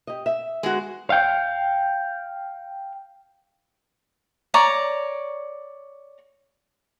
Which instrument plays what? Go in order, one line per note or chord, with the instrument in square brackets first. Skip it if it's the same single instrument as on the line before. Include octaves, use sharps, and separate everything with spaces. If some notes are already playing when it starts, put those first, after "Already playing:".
[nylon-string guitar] G4 D#5
E5
[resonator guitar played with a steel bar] G#3 F#4 [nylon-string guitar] B3
[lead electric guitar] F5 G5
[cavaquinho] C#5 D5 A#5